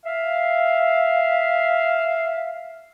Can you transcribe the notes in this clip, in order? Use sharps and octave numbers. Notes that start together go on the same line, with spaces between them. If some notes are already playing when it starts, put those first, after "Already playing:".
E5 F5